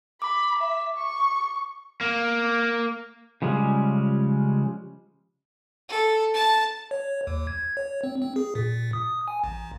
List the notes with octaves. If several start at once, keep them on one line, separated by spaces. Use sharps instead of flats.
B5 D6
E5
C#6
A#3
C#3 F3 G3 G#3 C#4
A4
A5
C#5
D#2
G#6
C#5
C4
C4
G#4
A#2
D#6
G#5
A1